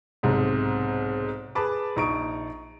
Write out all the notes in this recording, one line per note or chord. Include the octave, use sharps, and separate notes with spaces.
B1 G#2 C3
G#4 B4 A5 B5 D6
A#1 D#4 A#5 C#6 D#6 D7